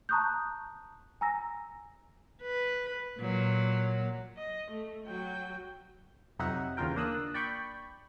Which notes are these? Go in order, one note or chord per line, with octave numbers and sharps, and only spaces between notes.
A5 A#5 C#6 D#6 F#6 G6
G#5 A#5 E6 A#6
B4
A#2 F#3
D#5
A3
F#3 G5
F2 C3 F#3 D#4 E5 F#5
D#2 C#3 E3 F4 A#4 G5
A#3 D4 D#6 E6 F#6
D5 G5 B5 C#6 G6